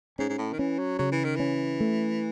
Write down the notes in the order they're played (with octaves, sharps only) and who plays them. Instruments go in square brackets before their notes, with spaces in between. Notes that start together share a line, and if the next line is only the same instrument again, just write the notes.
[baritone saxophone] G#2 [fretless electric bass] C#4
[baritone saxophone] G#2
A2
D#3
[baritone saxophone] E3 [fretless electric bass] C#4
[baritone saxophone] F#3
[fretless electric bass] C#3 [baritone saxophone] F#3
[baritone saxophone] E3
D#3
[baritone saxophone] E3 [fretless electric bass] C#4
[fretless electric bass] A3